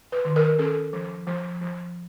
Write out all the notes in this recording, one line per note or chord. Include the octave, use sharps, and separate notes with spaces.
B4
D#3
A#4
C#4 A4
F3
F3
F3